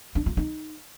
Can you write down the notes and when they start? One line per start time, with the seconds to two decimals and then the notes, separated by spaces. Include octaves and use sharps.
0.15 D4
0.26 F4
0.37 D#4